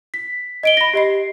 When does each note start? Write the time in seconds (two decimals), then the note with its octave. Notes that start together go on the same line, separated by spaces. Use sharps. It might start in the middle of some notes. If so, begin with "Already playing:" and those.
0.14 B6
0.63 D#5 D7 G7
0.77 B5 A#6
0.94 G4 D#5 C7